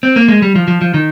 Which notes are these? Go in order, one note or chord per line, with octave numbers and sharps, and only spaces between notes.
C4
A#3
G#3
G3
F3
F3
F3
D#3